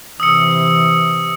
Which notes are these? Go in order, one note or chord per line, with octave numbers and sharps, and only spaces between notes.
C3 E3 D#6 E6 C#7